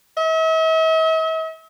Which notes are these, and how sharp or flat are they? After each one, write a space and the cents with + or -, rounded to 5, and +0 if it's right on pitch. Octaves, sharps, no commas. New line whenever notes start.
E5 -45